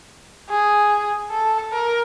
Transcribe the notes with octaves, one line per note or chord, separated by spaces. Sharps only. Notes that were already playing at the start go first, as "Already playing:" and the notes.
G#4
A4
A#4